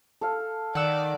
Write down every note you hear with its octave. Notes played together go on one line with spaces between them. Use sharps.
A4 F5
D#3 D5 F#5 E6